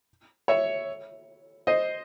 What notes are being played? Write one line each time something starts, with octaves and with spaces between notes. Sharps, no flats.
C#5 E5
C5 D#5